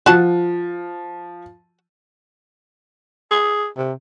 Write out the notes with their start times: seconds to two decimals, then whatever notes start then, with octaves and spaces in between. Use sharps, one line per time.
0.06 F3 F#4 F#5 A5
3.31 G#4
3.77 C3